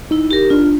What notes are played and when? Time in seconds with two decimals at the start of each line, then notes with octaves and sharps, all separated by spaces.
0.11 D#4 E4
0.31 G4 A#4
0.50 D4 F4